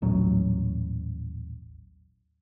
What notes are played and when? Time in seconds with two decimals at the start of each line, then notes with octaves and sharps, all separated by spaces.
0.02 D#1 A1 F#3